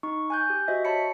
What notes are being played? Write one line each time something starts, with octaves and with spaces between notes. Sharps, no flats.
D#4 C#6
G#5 F#6 G6
G4
F#4 C5 D#5 E5
C#5 A5 B5 B6 C#7